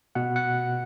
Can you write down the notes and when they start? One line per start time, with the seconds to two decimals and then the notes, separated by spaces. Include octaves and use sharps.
0.15 B2 F#5
0.36 F#5